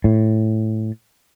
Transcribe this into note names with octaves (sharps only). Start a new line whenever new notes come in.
A2